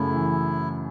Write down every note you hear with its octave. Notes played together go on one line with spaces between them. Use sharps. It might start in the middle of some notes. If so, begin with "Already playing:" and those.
Already playing: F#2 C#3 A3 E4
E3